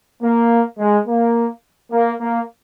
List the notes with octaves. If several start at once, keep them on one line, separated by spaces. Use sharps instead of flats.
A#3
G#3
A#3
A#3
A#3